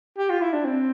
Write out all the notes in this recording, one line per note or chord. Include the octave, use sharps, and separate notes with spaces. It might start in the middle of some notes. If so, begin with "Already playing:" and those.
G4
F4
E4
D4
C4